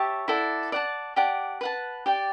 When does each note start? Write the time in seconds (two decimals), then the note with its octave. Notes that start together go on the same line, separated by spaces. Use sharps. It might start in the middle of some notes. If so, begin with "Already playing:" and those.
Already playing: G4 C#5 E5 A5
0.28 E4 A4 D5 F#5
0.72 D5 F#5 A5
1.16 G4 D5 F#5 A5
1.61 B4 F#5 A5
2.06 G4 D5 G5